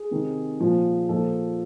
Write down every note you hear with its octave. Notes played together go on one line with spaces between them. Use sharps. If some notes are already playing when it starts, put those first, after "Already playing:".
Already playing: G#4
C3 D#3
A#2 F3
A#2 F3 A4